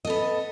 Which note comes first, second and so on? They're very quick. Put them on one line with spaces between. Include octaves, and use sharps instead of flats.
D#5 A4 B3